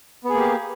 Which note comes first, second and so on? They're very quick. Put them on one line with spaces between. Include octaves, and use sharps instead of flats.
B3 G#4 A#3 G4